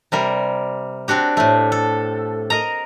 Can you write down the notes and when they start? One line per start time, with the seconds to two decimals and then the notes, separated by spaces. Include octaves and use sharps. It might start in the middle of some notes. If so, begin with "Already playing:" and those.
0.12 C3 G3 A#4
1.08 C4 D4 F#4 G4
1.37 A2 A3
1.72 A4
2.50 A#4 D#5 A#5